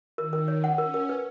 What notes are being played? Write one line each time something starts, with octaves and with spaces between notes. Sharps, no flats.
D#3 A#4
A#4
C#5
C#4 F#5
A#4
A#4
B4